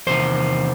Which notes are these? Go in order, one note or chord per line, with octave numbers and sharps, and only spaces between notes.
E2 C3 D#3 C5